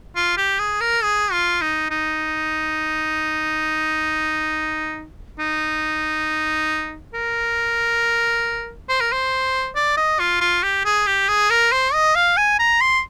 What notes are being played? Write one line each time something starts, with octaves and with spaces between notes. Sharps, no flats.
F4
G4
G#4
A#4
G#4
F4
D#4
D#4
D#4
A#4
C5
A#4
C5
D5
D#5
F4
F4
G4
G#4
G4
G#4
A#4
C5
D#5
F5
G#5
A#5
C6